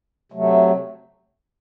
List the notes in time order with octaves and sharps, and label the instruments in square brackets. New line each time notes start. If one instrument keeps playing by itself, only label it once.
[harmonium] C3 F#3 A3